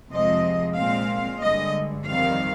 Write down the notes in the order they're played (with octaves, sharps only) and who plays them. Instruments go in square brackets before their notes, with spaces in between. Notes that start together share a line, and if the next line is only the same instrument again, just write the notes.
[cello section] F2 C3 F3 G#3 C4 D#5
A#2 G#3 C4 F5
G2 D3 G#3 D#5
F2 D#3 G3 C4 F5